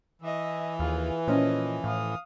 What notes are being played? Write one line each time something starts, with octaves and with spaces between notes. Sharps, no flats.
E3 D#5 E5
D#2 F4 G#4
A#2 F3 C#4 F4 D#5
A2 F5 D#6